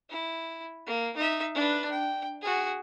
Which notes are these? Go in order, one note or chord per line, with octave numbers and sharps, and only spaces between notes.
E4
A#3
D#4 E5
D4 B4
G5
F#4 G#4